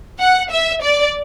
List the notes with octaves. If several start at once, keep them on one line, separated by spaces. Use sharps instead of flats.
F#5
E5
D5